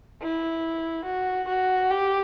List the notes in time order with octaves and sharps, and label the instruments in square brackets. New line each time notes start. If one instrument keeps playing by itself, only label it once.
[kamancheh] E4
F#4
F#4
G4